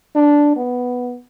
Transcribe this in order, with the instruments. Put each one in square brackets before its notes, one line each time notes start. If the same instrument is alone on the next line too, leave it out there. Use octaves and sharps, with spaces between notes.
[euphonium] D4
B3